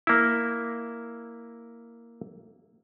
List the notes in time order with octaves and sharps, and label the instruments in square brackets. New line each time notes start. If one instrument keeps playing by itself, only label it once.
[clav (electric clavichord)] A#3 E4